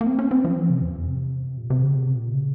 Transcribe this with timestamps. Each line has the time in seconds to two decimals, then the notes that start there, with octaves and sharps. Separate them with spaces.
0.01 A#3
0.06 C4
0.19 C#4
0.31 C4
0.45 F3
0.56 E3
0.69 C3
0.82 E2
0.95 F2
1.08 C3
1.58 A#2
1.70 C3
1.83 C#3
1.96 C3
2.16 A#2
2.34 C#3